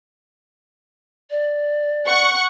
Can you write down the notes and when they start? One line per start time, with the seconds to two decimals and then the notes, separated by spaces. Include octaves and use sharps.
1.30 D5
2.07 F#5 C#6